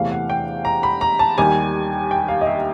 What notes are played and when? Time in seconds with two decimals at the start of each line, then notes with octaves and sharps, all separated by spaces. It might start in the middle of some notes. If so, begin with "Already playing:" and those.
Already playing: E2 C3 E3 A3 F5
0.11 F#5
0.30 G5
0.65 A#5
0.83 B5
1.01 A#5
1.19 A5
1.38 D#2 D#3 G3 G#5
2.11 G5
2.28 F5
2.41 D#5
2.47 E5